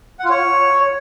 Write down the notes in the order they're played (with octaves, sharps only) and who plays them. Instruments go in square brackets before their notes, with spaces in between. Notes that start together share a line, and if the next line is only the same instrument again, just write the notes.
[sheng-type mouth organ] F#5
F4
C#5